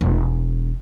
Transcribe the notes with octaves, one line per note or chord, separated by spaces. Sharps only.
E1